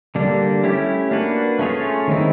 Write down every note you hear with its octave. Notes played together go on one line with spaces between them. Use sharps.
D3 G3 A#3 D4
A3 C#4 E4 G4
A#3 D4 F#4 B4
A3 C#4 F4 G#4 C#5
D#3 G#3 C4 E4